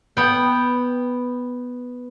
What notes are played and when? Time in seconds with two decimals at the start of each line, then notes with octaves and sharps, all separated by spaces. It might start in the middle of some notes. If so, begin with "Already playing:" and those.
0.17 B3 G5